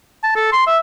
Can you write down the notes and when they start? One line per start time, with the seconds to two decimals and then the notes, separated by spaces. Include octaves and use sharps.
0.23 A5
0.36 A4
0.52 C6
0.67 E5